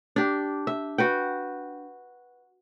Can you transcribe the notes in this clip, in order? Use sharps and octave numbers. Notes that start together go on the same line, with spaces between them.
D4 G4
E5
F#4 B4 G5